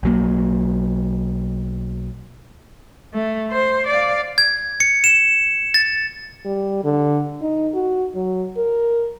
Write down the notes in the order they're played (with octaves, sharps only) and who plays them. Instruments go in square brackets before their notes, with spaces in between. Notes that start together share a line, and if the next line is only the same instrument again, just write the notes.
[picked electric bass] B1 F#3 A#3
[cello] A3
C5
D5 F5
[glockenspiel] G#6
C#7
E7
A6
[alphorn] G3
D3
D#4
F#4
F#3
A#4